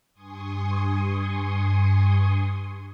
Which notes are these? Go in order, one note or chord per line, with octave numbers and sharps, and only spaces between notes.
G2 G#5 C6 C#6 D#6